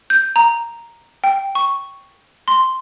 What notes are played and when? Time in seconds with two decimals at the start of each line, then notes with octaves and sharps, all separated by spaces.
0.10 G6
0.36 A#5
1.24 G5
1.55 C#6
2.48 C6